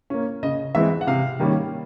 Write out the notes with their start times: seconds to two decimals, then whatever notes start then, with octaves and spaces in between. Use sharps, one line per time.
0.10 A#3 C#4
0.43 C#3 D#5
0.75 E3 G#3 C4 E5
1.01 F#5
1.07 C3 F5
1.40 D#3 G3 A#3 C#4